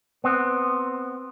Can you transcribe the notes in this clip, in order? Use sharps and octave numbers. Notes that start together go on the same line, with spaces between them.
B3 C4